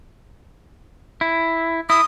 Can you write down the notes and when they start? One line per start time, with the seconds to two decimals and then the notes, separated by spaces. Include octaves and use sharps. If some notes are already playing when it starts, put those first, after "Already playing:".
1.21 E4
1.90 E4 D#6